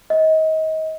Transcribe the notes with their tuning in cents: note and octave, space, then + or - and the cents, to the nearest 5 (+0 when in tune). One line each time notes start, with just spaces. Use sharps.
D#5 +30